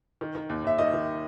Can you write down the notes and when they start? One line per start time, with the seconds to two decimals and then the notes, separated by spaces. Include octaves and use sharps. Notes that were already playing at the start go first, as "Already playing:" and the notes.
0.21 D#3
0.35 D#3
0.49 D#2
0.64 D#2 E5
0.78 D#3 D#5
0.93 D#3